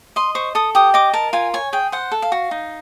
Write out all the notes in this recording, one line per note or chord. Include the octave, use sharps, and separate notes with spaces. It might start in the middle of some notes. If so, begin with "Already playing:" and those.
D#5 C6
C5 C#6
A4 D#6
G4 D#6
D#5 D6
A#4 A5
F4 G#5
C#5 G#5
G#4 G5
C5 F#5
A4
F5
F#4
D#4